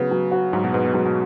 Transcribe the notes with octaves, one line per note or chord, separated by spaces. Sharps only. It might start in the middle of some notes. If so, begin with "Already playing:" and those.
Already playing: C#3 F#3 B3
F#3
F#4
G#2 F#3
B2
G#2 B3
B2
G#2 F#3
B2